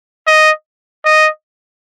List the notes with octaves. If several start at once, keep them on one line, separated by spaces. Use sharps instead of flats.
D#5
D#5